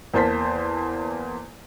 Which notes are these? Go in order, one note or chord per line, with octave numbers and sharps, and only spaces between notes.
E2 A#3 C5 A5 C6 B6